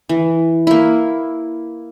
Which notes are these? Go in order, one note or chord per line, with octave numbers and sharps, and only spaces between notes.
E3
A#3 E4